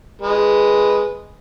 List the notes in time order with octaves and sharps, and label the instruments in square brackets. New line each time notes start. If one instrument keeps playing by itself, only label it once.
[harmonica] G#3 B4